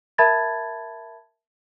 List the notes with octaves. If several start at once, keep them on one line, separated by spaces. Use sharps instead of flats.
A#4 E5 A5 B5 G#6 A6